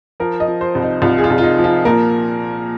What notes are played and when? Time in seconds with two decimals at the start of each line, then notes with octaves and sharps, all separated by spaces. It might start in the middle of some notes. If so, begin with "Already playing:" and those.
0.20 F3 A#4
0.40 D#5
0.47 F3
0.61 C5
0.75 C2
0.82 D#4
1.02 C2 F4
1.18 G#4
1.24 F4
1.30 C2
1.38 F4
1.44 D#4
1.58 F3
1.64 F4
1.85 A#2 A#4